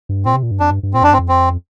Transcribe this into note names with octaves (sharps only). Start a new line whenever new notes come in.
G2
A#2 C4
C3
A#2
G2
F2 D4
G2
G2
A#2 C4
F2 D4
G2 C4
F2
C4